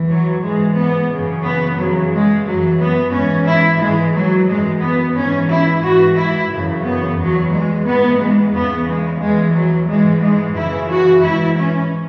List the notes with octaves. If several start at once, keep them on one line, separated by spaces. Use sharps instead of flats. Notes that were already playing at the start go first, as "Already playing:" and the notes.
Already playing: E2 E3
F#3
G#2 E3 G#3
B3
F#2 C#3 E3
B3
F#2 C#3 E3 F#3
G#3
F#2 E3 F#3
B3
G#2 E3 C#4
E4
G#2 E3 G#3
F#3
F#2 E3 G#3
B3
G#2 E3 C#4
E4
G#2 E3 F#4
E4
F#2 C#3 E3
B3
E2 E3 F#3
G#3
G#2 E3 B3
G#3
E2 C#3 E3 B3
G#3
E2 E3 G#3
F#3
G#2 E3 G#3
G#3
F#2 C#3 E3 E4
F#4
G#2 E3 E4
C#4